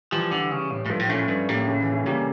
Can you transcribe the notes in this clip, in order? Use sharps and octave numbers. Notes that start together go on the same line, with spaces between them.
E3 F3 G3
D3
C#3
A2
A2
G2 F3 A3
A2
A#2 A3 C#4
A2
G2
A2 G3 A#3
C#3
C#3 E3
A3 C#4
C#3 G3 A#3